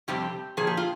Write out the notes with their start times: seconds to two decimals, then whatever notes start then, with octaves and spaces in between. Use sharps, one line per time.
0.08 F2 C3 G3 C4 G4
0.57 A#2 F3 A#3 G#4
0.67 G4
0.77 F4